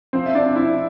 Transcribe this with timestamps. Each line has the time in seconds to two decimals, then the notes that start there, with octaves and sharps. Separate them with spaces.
0.13 F3 C4 C5
0.26 E5
0.35 D4 D5
0.55 C4 E4 E5